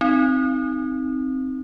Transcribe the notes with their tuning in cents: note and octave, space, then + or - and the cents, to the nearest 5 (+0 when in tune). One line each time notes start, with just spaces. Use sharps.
C4 +0 D#4 +0